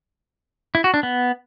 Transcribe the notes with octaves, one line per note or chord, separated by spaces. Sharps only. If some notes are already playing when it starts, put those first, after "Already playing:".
E4
F#4
D4
B3